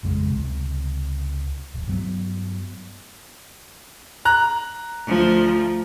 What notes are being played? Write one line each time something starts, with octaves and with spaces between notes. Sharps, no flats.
A1 F2 C#3 G#3
C#2 C3
D1
G2 F#3 B3
A#5 F#6
D2 F3